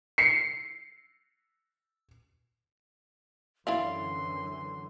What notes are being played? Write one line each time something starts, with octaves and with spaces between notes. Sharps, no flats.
C7 C#7
F#2 D3 E3 E4 D5 F5 C6